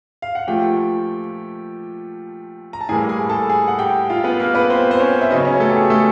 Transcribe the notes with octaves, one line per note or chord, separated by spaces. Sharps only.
F5
F#5
A#2 F3 A3 G4 G5
A#5
A5
A2 E3 G3 A#3 G#4 G#5
G#4 G#5
A4 A5
G#4 G#5
F#5
G4 G5
F4 F5
B3 B4
A#3 A#4
B3 B4
C4 C5
C5
C#4 C#5
E5
C#3 F#3 B3 D#4 D#5
C#4 C#5
A3 A4
G4
G#4
A3 A4